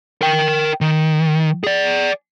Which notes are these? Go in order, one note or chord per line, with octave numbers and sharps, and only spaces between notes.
A#4 G5
D#3
G#4 D5